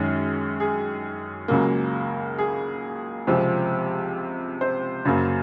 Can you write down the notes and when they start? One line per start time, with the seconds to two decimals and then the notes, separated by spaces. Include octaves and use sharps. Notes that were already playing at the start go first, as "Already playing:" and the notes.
Already playing: F#2 D#3 G#3 C#4 G#4
0.60 G#4
1.48 C#2 C#3 F#3 A#3
2.39 G#4
3.27 C#2 C3 F3 C4
4.61 C5
5.05 F#2 C#3 F#3 A#3